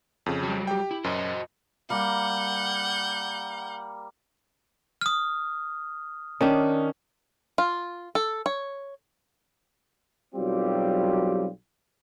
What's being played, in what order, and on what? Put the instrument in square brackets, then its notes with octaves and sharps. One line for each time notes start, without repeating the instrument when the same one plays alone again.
[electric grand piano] F2 C#3
[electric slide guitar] F#3 G3
[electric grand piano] G4 G5
[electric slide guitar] E4
[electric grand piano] F#2 [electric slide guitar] F#4 C5 D#5
[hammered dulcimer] G3 A#3 [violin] F#5 G6
[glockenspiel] D#6 F6
[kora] D#3 D4 [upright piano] C#4
[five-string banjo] F4
A4
C#5
[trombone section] B1 F#3 G3 C4 F4 G4